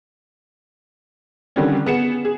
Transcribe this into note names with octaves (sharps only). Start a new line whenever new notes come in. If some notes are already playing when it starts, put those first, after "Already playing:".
D3 D#3 G3 C4 C#4
B3 G#4 C#7 E7
G#4